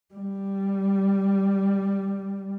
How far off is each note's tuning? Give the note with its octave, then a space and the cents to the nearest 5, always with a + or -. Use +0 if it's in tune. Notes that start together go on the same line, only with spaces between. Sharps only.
G3 +0